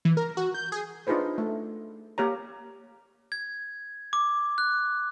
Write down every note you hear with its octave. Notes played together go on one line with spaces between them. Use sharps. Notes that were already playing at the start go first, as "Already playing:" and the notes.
E3
A#4
F#4
G6
G#4
D4 D#4 F4 G#4 B4 C5
A3
A#3 G4 C#5 A#5
G#6
D6
F#6